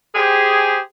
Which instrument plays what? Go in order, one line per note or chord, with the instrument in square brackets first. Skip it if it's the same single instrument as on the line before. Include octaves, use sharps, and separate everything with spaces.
[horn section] G4 G#4 C5